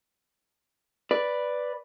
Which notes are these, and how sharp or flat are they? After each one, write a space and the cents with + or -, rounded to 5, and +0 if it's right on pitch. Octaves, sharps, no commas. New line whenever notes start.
B4 +0 D5 +0